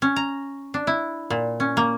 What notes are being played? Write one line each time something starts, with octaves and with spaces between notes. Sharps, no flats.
C#4
A#5
D4
E4
A#2
C#4
A#3